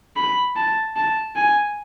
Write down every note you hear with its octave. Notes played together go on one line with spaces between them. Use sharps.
B5
A5
A5
G#5